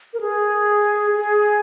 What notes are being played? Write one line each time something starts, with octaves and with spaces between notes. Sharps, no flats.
A#4
G#4
G#4